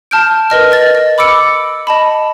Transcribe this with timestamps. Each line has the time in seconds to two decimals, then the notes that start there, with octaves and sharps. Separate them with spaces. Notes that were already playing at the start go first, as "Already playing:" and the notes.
0.11 A5 F6 G6 D7
0.50 A#4 B4 D#5 F6
0.71 B4 D#5 A6
0.95 D#5
1.18 B5 D6 E6 C#7 D7
1.87 D#5 A5 B5